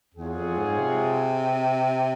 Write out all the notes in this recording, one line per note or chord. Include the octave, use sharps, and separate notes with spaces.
E2 C4 F4 G#4 C#5 F#5
F2
G#2
C3